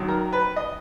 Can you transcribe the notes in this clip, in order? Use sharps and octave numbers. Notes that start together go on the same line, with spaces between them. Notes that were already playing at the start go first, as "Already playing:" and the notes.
Already playing: F#2 D#3 F#3
A#4
B4
D#5